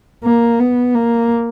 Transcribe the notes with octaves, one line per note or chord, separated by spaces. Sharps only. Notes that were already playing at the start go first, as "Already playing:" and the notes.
A#3
B3
A#3